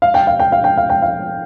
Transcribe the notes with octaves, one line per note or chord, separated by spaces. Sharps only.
F5
G5
F5
G5
F5
G5
F5
G5
F5